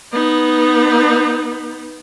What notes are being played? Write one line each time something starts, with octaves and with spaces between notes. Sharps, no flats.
B3 D#4